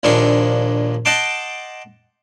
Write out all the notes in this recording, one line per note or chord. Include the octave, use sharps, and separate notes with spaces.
A#1 D#2 F3 D4 G#4 C#6
D#5 F#5 G5 A5 C6 D6